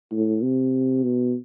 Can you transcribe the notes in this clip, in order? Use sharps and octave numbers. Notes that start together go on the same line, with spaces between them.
A2
C3
B2